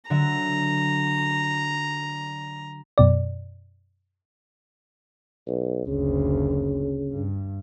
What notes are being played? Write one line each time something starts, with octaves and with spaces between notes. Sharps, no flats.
D3 F#3 E5 A#5
F#2 B2 D5
B1
F#1 D2 C#3
G2